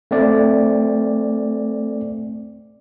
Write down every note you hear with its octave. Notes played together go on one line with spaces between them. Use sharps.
A3 C4 D5